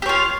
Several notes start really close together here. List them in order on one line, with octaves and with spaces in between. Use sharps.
G4 C#5 F4